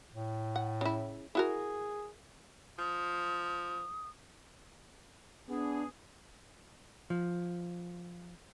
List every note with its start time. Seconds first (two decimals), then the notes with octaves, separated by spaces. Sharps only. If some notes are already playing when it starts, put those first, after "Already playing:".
0.15 A2
0.56 F#5
0.81 C#3 E4
1.35 E4 F#4 G#4 A#4
2.79 F3 D#6
5.49 B3 D4 G#4
7.10 F3